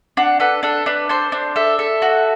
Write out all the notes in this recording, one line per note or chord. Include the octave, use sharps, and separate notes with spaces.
D4 F#5
A4 B4
D4 A4
D4 B4
A4 C5
D4
A4 E5
A4
F#4